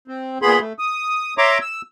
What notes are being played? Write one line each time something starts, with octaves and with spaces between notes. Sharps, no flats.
C4
A#2 B3 G#4 B5 C6
A3
D#6
C#5 E5 A#5 C6 D6
E6